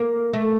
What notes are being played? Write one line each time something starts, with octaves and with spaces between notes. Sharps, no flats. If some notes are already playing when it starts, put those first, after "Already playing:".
Already playing: A#3
A3